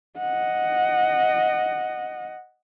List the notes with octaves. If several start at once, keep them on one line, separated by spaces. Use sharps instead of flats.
D#5 F#5